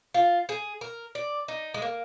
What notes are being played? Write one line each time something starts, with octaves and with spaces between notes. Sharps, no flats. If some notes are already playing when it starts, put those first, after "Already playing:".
F4
G#4
A#4
D5
D#4
G#3
A#3